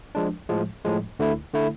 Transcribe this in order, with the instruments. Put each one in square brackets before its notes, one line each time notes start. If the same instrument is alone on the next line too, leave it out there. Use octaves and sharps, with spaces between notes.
[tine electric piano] F3 G#3 D4
A2 F3 G#3
A2 F3 G#3
D2 D3 A3 E4
D3 A3 E4